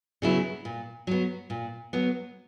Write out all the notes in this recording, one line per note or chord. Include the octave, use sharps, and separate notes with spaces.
C#3 F#3 B3 E4
A#2
F#3 B3
A#2
F#3 B3